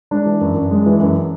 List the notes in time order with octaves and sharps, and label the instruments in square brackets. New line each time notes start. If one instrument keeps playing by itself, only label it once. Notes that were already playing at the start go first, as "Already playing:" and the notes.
[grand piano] G#3 D4
E3
F#2
F#2
G#3
E3
F#2